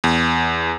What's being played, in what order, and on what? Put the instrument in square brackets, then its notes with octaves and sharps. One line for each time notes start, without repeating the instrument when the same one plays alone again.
[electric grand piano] E2